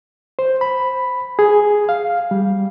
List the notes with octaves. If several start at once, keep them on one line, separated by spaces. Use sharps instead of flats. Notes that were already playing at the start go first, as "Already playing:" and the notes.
C5
B5
G#4
F5
G3